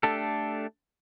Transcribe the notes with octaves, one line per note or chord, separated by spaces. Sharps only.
A3 D4 G4 A4